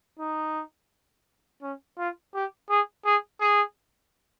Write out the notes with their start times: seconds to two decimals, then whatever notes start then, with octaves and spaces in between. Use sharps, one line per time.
0.19 D#4
1.62 C#4
1.98 F4
2.34 G4
2.70 G#4
3.05 G#4
3.40 G#4